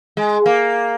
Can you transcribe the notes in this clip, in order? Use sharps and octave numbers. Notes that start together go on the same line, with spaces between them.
G#3
A#3